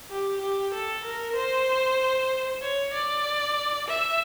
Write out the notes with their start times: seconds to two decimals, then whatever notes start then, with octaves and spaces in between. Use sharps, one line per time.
0.11 G4
0.42 G4
0.74 A4
1.04 A#4
1.36 C5
2.62 C#5
2.94 D5
3.88 E5